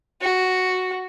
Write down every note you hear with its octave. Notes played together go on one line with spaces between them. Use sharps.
F#4